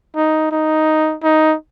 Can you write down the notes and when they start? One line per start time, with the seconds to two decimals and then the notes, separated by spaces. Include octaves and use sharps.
0.16 D#4
0.52 D#4
1.23 D#4